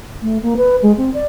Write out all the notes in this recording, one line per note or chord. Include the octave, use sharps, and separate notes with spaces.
A3
A#3
B4
G#3
C4
D5